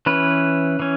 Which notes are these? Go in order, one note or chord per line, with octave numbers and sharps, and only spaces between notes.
E3 C#4 B4
E3 C#4